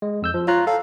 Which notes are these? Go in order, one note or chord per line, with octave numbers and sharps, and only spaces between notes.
G#3
F2 E6 G6
F3
F4 C#5 A#5 F#6
A4 F5